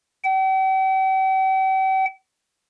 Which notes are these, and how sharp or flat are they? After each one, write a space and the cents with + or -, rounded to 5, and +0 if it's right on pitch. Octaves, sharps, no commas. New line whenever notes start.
G5 -45